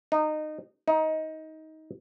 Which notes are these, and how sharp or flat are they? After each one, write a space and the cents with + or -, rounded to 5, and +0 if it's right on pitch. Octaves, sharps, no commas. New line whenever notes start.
D#4 -20
D#4 +20